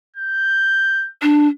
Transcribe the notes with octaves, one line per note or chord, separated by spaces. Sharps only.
G6
D4